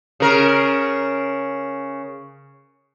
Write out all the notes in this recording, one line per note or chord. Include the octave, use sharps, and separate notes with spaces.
C#3 A#4